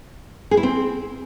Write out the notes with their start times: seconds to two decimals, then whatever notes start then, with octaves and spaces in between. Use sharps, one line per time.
0.51 G#4
0.57 E4
0.63 C4